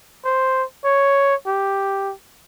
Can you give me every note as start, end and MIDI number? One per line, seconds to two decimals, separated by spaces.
0.24 0.63 72
0.84 1.35 73
1.46 2.13 67